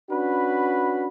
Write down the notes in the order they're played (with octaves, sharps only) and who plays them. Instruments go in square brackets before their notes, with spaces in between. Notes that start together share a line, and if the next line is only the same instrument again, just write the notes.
[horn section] C#4 D4 F#4 B4 B5